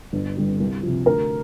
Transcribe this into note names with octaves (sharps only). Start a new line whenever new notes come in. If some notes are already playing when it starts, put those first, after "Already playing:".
G1
G2 D3 G3
C2
C3 F3
D2 A#4